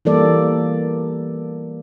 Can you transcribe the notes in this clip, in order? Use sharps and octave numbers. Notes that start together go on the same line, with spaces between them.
E3 G3 A#3 A4 D5